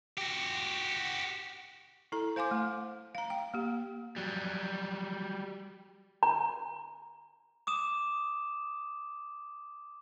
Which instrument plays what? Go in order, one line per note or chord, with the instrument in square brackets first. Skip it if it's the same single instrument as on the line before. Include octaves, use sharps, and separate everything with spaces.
[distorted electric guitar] F#4 G4
[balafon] E4 A4 A#5
C5 F5 G#5 C6 D6
A3
F5 A#5
G5
A#3 G4
[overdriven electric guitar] F#3 G3
[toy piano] A#5
[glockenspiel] D6 D#6 E7